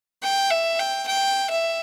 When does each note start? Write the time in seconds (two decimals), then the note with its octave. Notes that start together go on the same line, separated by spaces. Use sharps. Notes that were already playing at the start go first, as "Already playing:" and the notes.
0.23 G5
0.50 E5
0.79 G5
1.07 G5
1.50 E5